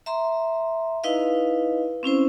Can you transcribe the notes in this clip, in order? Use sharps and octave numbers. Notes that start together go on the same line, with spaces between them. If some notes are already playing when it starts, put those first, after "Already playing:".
E5 A#5 C6
D#4 E4 B4 D#5 F5
C4 C#4 E4 C5